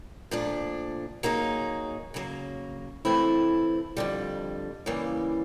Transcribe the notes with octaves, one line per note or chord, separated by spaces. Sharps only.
A#2 F3 A3 D4
F#3 A#3 D#4 G#4
C#3 F#3 A#3
E3 A3 C4 E4
F2 D3 G3
C#3 E3 G3 A#3